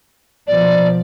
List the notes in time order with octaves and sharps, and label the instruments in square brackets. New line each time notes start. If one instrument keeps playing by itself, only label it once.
[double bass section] B2 F3 [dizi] D5